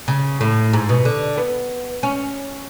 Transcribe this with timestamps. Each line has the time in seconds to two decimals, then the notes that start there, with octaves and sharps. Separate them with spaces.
0.08 C#3
0.41 A2
0.73 G#2
0.89 B2
1.05 D3
1.37 B3
2.03 C#4